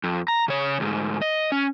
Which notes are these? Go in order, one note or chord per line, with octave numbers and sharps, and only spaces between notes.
F2
A#5
C#3 C#5
D2 G#2
D#5
C#4